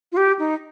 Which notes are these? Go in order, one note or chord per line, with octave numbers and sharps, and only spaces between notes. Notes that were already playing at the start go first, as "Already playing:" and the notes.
F4
G4
D#4